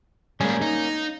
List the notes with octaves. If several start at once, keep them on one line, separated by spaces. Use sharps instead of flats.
G3 G#3 A#3 C#4
D#4